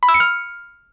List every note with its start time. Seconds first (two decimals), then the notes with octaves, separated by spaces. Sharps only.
0.03 B5
0.08 E6
0.14 C#7
0.20 F6